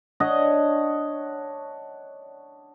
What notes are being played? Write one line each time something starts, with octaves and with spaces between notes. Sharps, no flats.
D4 C#5 D#5 F#5